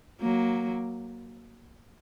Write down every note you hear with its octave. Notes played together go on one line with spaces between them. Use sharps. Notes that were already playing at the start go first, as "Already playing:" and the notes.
F#3 A#3